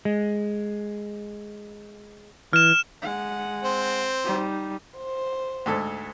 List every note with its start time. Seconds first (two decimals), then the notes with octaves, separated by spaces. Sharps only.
0.05 G#3
2.53 E3 F6 E7
3.02 G#3 F#5
3.63 C4
4.24 G3 D#4
4.97 C5
5.66 D2 G#2 A4